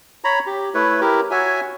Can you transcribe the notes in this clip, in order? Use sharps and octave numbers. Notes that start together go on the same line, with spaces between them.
C#5 A#5 B5
G4
A3 E4 B4 C#5
E4 G4 A#4
F#4 C#5 E5 G#5